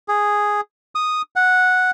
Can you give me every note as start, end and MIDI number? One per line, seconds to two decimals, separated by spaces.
0.08 0.61 68
0.95 1.22 87
1.36 1.91 78